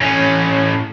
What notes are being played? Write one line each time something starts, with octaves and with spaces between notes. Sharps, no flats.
A2 C#4